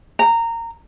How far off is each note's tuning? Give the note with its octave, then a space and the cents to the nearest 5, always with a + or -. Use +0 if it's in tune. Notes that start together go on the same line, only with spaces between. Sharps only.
A#5 -20